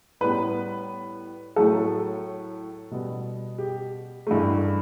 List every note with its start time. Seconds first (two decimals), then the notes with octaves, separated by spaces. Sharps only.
0.21 A2 G3 B3 B4
1.56 A2 F#3 A3 A4
2.91 B2 G3 B3
3.58 G4
4.27 G2 E3 A3